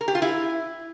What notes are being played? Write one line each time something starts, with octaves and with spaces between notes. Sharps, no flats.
A#4
G4
F4
E4